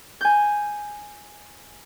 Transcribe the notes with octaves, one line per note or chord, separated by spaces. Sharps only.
G#5 G6